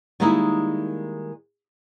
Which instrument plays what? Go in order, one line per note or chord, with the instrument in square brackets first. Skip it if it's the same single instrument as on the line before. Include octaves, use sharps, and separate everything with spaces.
[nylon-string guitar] D#3 G3 G#3 A#3 D#4 E4